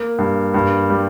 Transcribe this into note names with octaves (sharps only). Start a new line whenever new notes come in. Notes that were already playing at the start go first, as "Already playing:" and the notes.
Already playing: A#3
G2
G2
G3